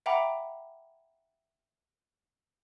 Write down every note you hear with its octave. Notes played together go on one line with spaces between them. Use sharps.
E5 F#5 G5 A#5 B5 D6